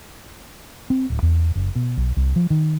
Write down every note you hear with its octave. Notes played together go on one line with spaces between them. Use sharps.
C4
D1
E2
F#1
B2
B1
C2
F3
D#3